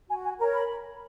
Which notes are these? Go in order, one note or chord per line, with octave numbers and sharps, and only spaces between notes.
F#4 G#5
G#5
A#4 C#5 A#5
B5